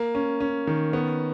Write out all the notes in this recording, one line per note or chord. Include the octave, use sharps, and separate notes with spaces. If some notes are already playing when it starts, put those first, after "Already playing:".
Already playing: A#3
C#4
C#4
D#3
B3